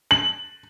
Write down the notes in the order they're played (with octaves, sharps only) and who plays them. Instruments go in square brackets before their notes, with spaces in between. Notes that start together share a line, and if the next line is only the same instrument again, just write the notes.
[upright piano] F#7